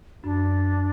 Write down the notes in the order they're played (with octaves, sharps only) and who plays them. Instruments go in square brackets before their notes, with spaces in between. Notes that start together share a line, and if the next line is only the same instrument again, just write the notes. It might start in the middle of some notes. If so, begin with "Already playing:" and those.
[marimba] F#2 [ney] D4